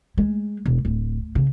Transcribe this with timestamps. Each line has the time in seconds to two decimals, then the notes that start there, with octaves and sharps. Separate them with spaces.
0.18 G#3
0.66 E1
0.85 D1
1.35 C#3